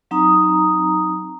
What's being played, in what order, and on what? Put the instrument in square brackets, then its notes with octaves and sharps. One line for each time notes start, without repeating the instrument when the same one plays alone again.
[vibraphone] F#3 C4 D#4 A#5 D#6